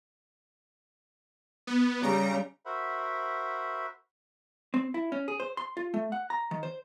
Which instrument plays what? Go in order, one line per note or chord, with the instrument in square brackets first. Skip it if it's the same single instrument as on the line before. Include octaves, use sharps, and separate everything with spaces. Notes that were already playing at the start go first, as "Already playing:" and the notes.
[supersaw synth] B3
[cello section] C#3 G3 [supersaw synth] A#5
[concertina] F#4 A#4 C5 E5 F#5 B5
[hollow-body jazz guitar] C4
E4
C#4
G#4
C5
C6
F4
A3
F#5
A#5
D#3
C5